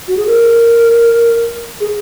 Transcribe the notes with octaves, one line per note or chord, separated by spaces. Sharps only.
F#4
G#4
A#4
G#4